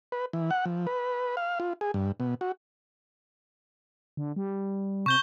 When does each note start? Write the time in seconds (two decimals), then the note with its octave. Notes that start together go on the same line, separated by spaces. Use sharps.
0.12 B4
0.33 E3
0.51 F#5
0.66 F3
0.87 B4
1.37 F5
1.60 F4
1.81 G#4
1.94 G2
2.20 B2
2.41 F#4
4.17 D3
4.36 G3
5.06 C3 C#6 G6 G7